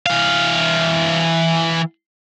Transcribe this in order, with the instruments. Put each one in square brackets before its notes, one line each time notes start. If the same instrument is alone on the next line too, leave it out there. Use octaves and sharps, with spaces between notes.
[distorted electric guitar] E3 F5